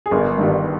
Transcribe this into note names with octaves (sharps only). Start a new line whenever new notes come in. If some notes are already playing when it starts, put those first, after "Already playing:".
G#4
G1 A#4
G2 D#3 G3